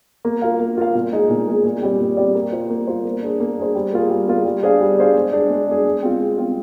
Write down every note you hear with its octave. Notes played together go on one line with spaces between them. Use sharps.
A#3
F4 A#4 F5
A#3
F4 A#4 F5
A#2
G#3 D#4 G#4
A#2
G#3 D#4 G#4
A#2
G3 C4 G4 D5
A#2
G3 C4 G4 D5
A#3
F4 C5
A#3
F4 C5
A#3
D4 G#4 C5
A#3
D4 G#4 C5
G3
A#3 F4 G#4
G3
A#3 F4 G#4
G3
D4 G#4 C5 F5
G3
D4 G#4 C5 F5
G#3
D4 G#4
G#3
D4 G#4
G#3
C4 F4
G#3
C4 F4